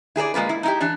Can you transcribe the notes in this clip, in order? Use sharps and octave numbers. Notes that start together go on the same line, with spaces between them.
E4 G#4 A4 D5
G#3 A#3 F4 B4
E4
D#4 E4 G4
E3 D4